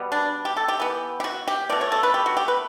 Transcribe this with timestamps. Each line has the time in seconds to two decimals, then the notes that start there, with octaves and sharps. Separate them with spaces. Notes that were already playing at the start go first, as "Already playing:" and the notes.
Already playing: B2 G3 B3
0.12 D4
0.45 G4
0.57 A4
0.68 G4
0.80 E3 B3
1.20 G4
1.24 F#4
1.48 G4
1.70 B2 A3 D5
1.81 C#5
1.92 A4
2.03 B4
2.14 G4
2.26 F#4
2.37 G4
2.48 B4